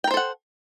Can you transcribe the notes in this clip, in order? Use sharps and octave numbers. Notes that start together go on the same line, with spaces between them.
A4 A#4 C5 F#5 G5